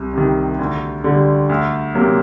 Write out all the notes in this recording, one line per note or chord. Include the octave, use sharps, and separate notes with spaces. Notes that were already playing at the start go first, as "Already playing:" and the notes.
Already playing: C2
C3 D#3
D2
D3 G3
D2
C3 F#3 A#3